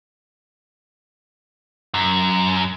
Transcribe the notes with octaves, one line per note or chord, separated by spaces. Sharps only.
F#2